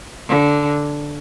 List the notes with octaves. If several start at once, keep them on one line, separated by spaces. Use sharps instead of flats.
D3